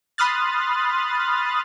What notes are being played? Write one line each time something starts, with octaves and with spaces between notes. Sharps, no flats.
B5 C6 D#6 F6 F#6 A6